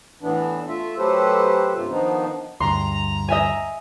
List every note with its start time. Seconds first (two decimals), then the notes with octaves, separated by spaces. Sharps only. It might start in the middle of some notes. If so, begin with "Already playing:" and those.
0.22 A2 E3 B3 D4
0.68 A3 F4 E5
0.98 F#3 A3 G4 A4 B4 C5
1.75 G2 C3 F4
1.89 D#3 F3 B3 D4 D#4
2.60 D2 G2 A#5 C6
3.28 D#5 E5 G#5